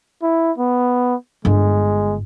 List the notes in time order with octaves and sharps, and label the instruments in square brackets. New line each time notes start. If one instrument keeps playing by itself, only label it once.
[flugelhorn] E4
B3
[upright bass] G1 [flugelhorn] G#3